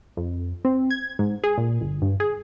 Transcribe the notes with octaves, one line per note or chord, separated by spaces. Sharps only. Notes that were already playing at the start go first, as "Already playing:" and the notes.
F2
C4
G#6
G#2
G#4
A#2
G1
G2
G#4